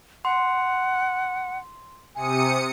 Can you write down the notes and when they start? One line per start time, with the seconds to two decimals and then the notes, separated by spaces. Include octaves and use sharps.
0.25 F#5 C6
2.15 C3 G#5 D#6 C#7